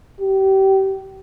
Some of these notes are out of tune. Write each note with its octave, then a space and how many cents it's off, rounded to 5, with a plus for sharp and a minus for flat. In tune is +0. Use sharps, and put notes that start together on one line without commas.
G4 -30